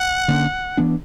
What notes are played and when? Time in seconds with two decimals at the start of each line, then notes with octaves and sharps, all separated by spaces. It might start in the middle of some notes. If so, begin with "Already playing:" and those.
Already playing: F#5
0.28 D3 A#3 C#4
0.77 E3 B3 D4